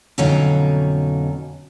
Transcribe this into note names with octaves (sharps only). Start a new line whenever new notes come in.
F2 B2 D3 F#3 C#4 D#4